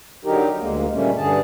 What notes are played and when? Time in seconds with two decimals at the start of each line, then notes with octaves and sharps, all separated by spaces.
0.25 D3 F#3 D#4 G4 A#4
0.59 D2 G#3 A#3
0.93 A#2 C#3 G3 A3 A#3 C#4
1.17 G2 D3 G#4 A5